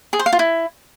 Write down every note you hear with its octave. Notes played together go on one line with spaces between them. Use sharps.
G#4
C5
F5
F4
E4